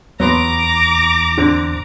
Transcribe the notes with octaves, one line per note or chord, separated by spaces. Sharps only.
E2 F#3 B3 A#5 C6 D6
D3 C4